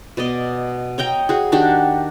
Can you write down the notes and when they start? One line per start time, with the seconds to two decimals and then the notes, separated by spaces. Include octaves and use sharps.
0.17 B2 D5 D#5
0.98 C#5 D#5 G5 A#5
1.29 F#4 G#4
1.52 D#3 D4 F#4 G4